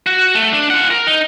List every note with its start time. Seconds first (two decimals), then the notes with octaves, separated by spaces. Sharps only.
0.07 F#4
0.35 A3
0.52 D4
0.70 F4 F#5
0.91 A#4
1.07 D#4